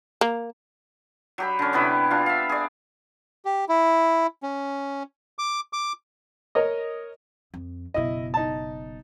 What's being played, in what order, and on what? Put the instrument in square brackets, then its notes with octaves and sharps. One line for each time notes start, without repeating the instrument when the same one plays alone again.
[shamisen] A#3
[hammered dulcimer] F#3 G4 B5
D3 C#4
C3 B3 E4 B4
D4 F4
E5 F5
G#4 D5
[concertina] G4
E4
C#4
D6
D6
[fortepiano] A#4 C#5 D#5
[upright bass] F2
[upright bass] F#1 B2 [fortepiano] E4 D#5
[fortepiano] D#4 A5